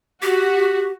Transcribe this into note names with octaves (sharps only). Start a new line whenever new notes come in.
F#4 G4